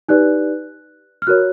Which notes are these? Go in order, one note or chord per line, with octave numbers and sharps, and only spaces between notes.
D#4 G4 B4 D5 F#6
F6
F#4 A#4 C#5 F#6